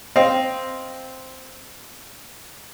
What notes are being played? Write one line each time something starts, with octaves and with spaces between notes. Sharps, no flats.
C4 D#5 F5